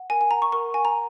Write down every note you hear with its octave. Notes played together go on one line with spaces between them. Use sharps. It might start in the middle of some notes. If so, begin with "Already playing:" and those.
Already playing: F#5
A#4 G#5
G#5
F#5 A#5
C#6
A#4 C#6
F#5 G#5
A#5